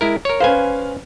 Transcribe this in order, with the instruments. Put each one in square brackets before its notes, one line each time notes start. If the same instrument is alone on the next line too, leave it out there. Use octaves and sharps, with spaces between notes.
[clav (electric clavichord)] G#3 E4 A#4
A#4 C#5
[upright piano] C#4 B4 F5 [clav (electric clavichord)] C5 G#5